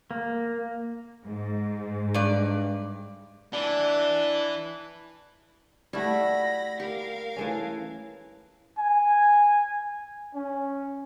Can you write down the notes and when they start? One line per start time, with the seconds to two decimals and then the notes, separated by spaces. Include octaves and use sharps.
0.11 A#3
1.26 G#2
2.14 G2 D5
3.53 E3 D4
5.93 G3 A3 E4 F#4 B5 A#6
6.80 G4 A#4 F5
7.36 E3 A3 C#4
8.78 G#5
10.35 C#4